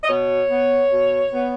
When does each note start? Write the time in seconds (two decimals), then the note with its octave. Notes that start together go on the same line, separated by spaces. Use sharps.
0.04 D#5
0.09 B2 C#5
0.50 B3
0.91 B2
1.33 B3